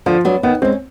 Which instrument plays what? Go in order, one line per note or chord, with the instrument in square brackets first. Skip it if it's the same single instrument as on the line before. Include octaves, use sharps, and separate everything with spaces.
[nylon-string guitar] D3 [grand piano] F3
[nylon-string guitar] F#3 B3 D4
[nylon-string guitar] D#3 [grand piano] B3
[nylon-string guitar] G#3 [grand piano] C4
[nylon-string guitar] C#4